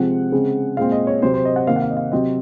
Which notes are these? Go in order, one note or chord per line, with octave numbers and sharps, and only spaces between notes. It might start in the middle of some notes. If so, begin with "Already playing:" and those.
Already playing: C3 F3 G#3 C4 F#5
C#3 G#3 C4
A#2 G#3 C4 F5
D#5
C#5
C3 F#3 C4 C5
C5
D#5
F#5
C3 D#3 A#3 F5
F#5
F5
D#5
F5
C3 F#3 C4 D#5